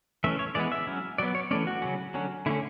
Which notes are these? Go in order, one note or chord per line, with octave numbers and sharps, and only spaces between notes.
E3 A3 C#4 E5
C#5
E3 G#3 B3 D5
E5
F#3 C#4
F#3 B3 D5
C#5
E3 A3 C#4 D5
F#4
C#3 F#3 C#4
D3 F#3 C#4
D3 A3 C#4 E4